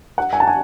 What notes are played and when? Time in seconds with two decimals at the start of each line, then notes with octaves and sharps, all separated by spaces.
0.18 F#5
0.33 G#5
0.40 A5
0.48 G#5